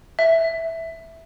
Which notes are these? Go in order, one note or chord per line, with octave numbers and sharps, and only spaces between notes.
E5